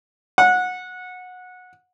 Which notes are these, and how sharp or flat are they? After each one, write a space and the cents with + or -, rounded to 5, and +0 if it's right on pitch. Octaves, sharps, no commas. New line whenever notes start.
F#5 -20